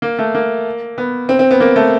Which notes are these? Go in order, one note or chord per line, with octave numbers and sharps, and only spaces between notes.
A#3
A3
A#3
B3
C4
C4
B3
A#3
A3